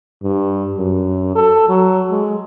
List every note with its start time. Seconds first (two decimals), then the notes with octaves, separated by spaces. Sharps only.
0.23 G2
0.78 F#2
1.36 A4
1.69 F#3
2.11 G#3